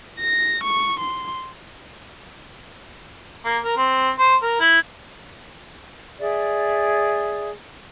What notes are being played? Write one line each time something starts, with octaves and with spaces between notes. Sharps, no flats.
A#6
C#6
C6
A#3
A#4
C4
C5
A#4
E4
G#4 D5 E5